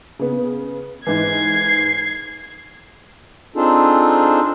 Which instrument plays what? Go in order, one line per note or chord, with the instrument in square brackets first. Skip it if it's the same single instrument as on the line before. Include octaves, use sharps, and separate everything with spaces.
[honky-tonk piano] C#3 B3
[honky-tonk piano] G#2 E3 [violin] G#6 C7
[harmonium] C4 D4 D#4 F4 G#4 A4